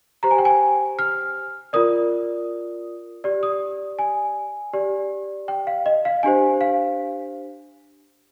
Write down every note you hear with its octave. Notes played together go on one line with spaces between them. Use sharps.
G4 C5 A#5
G#5
G5
G#5
F6
F4 A#4 D5 D#6
G4 D5
D#6
G#5
G4 D5
G5
F5
D#5
F5
D4 G4 C5 G#5
F5